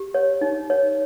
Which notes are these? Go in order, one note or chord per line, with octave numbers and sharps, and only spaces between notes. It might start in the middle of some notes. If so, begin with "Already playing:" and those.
Already playing: G4
C#5
D#4
C#5